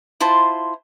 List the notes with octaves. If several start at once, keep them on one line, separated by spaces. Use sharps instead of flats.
E4 F4 C5 A5